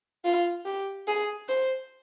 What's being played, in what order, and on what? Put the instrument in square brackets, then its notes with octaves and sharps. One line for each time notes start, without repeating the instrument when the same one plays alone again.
[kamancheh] F4
G4
G#4
C5